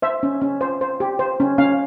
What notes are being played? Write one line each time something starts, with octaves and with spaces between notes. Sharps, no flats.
C5 E5
C#4
C#4
C5
C5
G4
C5
C#4
C#4 F5